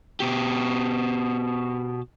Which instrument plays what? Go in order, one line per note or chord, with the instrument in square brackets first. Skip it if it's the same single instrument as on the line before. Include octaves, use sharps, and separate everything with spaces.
[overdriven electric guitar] B2 G4